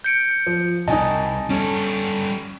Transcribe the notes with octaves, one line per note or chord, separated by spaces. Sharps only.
G6 C#7 D7
F3
C2 D#4 D#5 G#5 A5
G3 C#4 A4